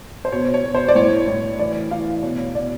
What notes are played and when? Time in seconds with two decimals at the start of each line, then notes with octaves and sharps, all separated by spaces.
0.25 C5
0.32 B2 C#5
0.54 C#5
0.64 B2
0.75 C5
0.88 D5
0.95 A2 C#5
1.27 A2 C#5
1.59 E3 D5
1.91 E3 F5
2.23 B2 C#5
2.54 B2 D5